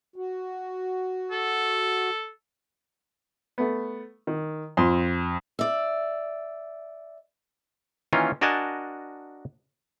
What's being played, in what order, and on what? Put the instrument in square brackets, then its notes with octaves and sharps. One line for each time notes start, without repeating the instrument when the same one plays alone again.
[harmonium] F#4
[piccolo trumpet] A4
[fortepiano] A3 B3
D#3
[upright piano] F2 [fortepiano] C6
[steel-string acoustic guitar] D5 E5
[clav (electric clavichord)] D#3 E3 A#3 C#4 F4
D4 F#4 A#4 D#5 G#5 A5